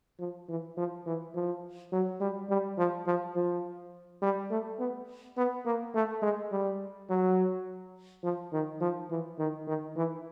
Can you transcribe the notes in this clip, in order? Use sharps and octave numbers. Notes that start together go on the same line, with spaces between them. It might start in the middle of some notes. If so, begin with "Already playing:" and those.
F3
E3
F3
E3
F3
F#3
G3
G3
F3
F3
F3
G3
A3
B3
B3
A#3
A3
G#3
G3
F#3
F3
D#3
F3
E3
D#3
D#3
E3